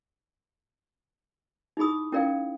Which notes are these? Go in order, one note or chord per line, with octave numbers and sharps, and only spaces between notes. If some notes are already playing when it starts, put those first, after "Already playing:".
D#4 E4 G#4 B5 D#6
C#4 E4 A#4 D5 F5 G5